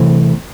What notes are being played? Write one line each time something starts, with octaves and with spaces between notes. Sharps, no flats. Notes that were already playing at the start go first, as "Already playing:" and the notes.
Already playing: C3 E3 A3 C4